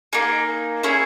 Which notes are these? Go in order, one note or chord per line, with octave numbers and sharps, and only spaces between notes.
A#3 D#4 G#4
C#4 E4 G#4